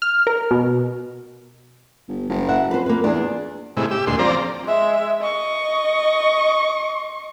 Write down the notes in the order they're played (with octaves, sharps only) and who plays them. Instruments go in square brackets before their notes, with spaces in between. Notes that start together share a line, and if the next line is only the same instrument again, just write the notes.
[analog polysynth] F6
A#4
B2
[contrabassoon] G1
F#1
[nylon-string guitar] E5 F#5
[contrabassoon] F2 [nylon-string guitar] B4 C5
[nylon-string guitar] A#3 B4
[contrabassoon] E2 [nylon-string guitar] D4 G#4
[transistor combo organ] A2 C3 G#3 E4
G4 E6
D2 A#2 G#3 C6
F3 C4 D5 A#5
[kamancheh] G#3 E5
D#5 C#6